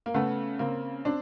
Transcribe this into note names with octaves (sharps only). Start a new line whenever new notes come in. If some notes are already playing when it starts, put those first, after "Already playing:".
A#3
C#3 A3 B3
C#3 A#3 C4
C4 D4